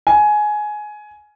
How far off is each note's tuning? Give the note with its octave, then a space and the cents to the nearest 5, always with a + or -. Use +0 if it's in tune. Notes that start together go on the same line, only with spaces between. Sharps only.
G#5 +15